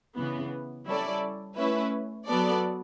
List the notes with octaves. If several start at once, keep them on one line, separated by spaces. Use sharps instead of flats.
C#3 E3 B3
G3 C#4 E4 A4 D5
A3 C#4 E4 B4
F#3 B3 F#4 A4 D5